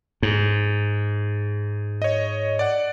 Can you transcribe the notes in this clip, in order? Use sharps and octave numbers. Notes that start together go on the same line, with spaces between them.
G#2
C#5 D#5
D5 F#5